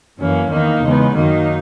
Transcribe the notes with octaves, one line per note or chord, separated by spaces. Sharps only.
F#2 E3 A#3 C#4
E2 D#3 A#3 D#4
E2 C#3 G#3 B3
F#2 D#3 F#3 A#3 D#4